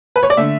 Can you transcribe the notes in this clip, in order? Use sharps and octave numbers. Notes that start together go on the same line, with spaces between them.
B4
C#5
D5
D3 A3 E5